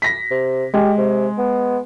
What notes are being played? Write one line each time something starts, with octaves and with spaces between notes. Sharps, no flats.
A#6 B6
C3
G#3 G4
C3
B3